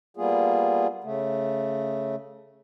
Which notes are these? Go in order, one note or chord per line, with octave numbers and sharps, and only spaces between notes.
G3 A#3 B3 F4 G#4
C#3 A3